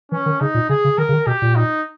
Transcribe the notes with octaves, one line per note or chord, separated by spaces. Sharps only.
E3 C#4
D#3
C#3 D#4
A#2
C#3 G#4
C#3
D#3 A#4
C#3
D#3
B2 G4
A#2
D#4